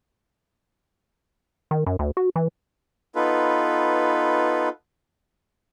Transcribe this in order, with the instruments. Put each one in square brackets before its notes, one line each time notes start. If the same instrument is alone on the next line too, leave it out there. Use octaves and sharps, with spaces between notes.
[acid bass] D#3
F#2
D2
F#4
E3
[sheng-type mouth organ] B3 D#4 F4 A4 B4